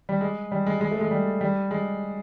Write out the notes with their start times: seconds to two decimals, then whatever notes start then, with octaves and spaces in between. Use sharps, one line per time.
0.09 G3
0.21 G#3
0.52 G3
0.66 G#3
0.81 G#3
0.91 A3
1.01 G#3
1.11 G3
1.41 G3
1.71 G#3